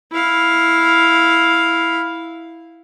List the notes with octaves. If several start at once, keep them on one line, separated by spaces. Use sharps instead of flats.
E4 F5